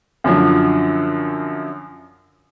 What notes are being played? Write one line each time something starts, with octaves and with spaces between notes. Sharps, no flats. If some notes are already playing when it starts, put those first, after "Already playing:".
F#2 D3 F3 F#3